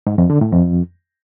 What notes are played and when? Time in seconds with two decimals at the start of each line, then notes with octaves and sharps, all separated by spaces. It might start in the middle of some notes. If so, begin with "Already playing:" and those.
0.07 G#2
0.18 F2
0.30 D3
0.41 A2
0.53 F2